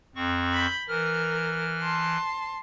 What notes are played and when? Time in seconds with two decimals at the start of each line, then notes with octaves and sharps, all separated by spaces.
0.15 F2 C4 C#6
0.53 B5 G6
0.89 E3 A#4 F6
1.81 A5 C6